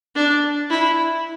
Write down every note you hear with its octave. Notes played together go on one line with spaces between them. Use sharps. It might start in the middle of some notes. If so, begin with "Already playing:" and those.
D4
E4